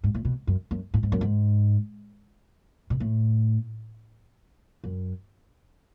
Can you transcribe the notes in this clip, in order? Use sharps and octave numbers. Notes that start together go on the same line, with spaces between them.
G#2
A2
B2
F#2
F#2
A2
G#2
F#2
G#2
B2
A2
F#2